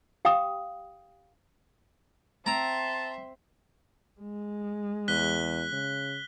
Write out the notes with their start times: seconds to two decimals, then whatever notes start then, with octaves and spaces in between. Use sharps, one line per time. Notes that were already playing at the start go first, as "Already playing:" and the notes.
0.25 G4 F5 G5 A#5 D#6
2.46 C4 E5 G5 A5 A#5 C6 E6
4.21 G#3
5.08 E2 F#6 B6 G7
5.73 C#3